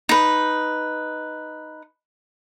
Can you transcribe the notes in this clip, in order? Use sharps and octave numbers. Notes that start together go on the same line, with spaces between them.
D#4 B4